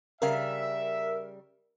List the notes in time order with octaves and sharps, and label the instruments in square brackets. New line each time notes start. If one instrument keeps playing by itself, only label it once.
[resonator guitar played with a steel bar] C#3 G3 F5 [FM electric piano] A#4 [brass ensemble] E5